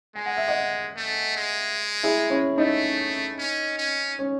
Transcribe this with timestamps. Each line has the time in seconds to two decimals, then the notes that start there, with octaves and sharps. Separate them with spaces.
0.15 G#3 G#5
0.26 F#5
0.37 E5
0.48 D#5 F#5
0.96 A3
1.36 G#3
2.03 E4 G#4
2.30 C#4 E4
2.58 A3 D#4
3.38 C#4
3.78 C#4
4.19 C#4